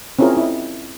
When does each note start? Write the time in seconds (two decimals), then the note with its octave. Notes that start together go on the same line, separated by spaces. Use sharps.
0.19 C4 C#4 E4 F4 G#4 A#4
0.37 E4 D#5